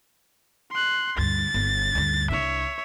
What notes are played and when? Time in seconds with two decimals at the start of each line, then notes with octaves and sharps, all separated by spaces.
0.71 C6 F#6
1.17 D2 G2 A6
1.54 G1
1.95 D2 G2
2.31 C2 D4 C#5 E5